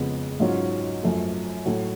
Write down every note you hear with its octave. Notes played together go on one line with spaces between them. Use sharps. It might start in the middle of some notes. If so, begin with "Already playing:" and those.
Already playing: F2 C#3 G#3 B3
G#2 F#3 C#4 F4
F#2 F3 A3
A2 F#3 A3